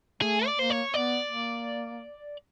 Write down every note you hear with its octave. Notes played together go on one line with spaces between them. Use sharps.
A3 G#4
D5
A#3 C5
C#5
B3 D5
A#3